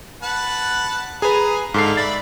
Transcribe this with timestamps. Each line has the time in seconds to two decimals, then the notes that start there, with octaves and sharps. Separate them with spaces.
0.23 B4 F#5 A5
1.22 G#4 B4 G#5 A#5
1.74 G#2 D3 A4 F5 C7
1.97 D5 E5 B5 A6